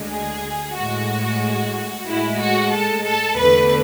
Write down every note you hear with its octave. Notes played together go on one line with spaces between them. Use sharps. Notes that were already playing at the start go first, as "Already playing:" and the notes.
Already playing: D2 D3 G#3
G#4
A2 G#3 F#4
A2 G#3 E4
F#4
A4
A4
E2 D3 A3 B4